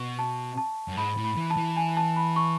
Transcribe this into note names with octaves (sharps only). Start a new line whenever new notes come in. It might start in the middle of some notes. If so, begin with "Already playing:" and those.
Already playing: B2 C#6
A5
A5
F#2
G#2 B5
A2
B5
E3
A5
E3
G#5
A5
B5
C#6